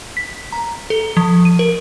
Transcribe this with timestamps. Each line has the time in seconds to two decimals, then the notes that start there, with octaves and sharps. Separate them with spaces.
0.17 B6
0.52 A#5
0.90 A4
1.17 F3
1.45 D#7
1.59 A#4